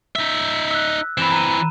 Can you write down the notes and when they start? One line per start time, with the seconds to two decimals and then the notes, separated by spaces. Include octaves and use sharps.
0.16 D#4 E5
0.71 E6 F#6
1.18 E3 C4 B5 E7
1.32 A#5 D#7